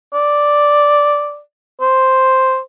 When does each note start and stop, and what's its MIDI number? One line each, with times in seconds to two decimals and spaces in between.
0.14 1.40 74
1.81 2.59 72